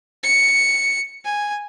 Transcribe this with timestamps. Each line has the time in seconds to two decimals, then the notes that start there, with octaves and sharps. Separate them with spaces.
0.23 C#7
1.25 G#5